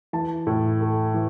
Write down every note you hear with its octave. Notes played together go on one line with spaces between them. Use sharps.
E3 A5
A2
A3
E3